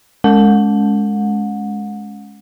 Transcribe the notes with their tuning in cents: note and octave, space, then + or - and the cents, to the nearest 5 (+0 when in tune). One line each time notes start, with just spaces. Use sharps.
G#3 +15 C#4 +10 F#5 -30